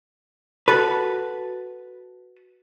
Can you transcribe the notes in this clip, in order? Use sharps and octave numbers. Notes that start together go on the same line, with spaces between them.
F#4 A4 B4